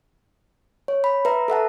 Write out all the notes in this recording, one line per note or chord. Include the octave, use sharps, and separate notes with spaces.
C#5
B5
B4 E5 A#5
A4 E5 F#5 A5